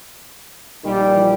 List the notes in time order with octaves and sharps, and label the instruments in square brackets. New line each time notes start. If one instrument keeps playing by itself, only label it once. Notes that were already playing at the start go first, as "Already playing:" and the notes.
[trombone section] A#1 A#2 G3 [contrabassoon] D#3
[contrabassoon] E3
F3